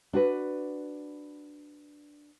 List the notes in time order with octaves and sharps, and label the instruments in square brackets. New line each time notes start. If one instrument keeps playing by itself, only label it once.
[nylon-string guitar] D4 F#4 B4